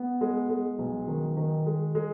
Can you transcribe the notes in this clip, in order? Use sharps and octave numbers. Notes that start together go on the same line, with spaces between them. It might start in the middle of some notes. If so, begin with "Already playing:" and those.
Already playing: B3
G#3
G#3
B1
D#3
D#3
G#3
G#3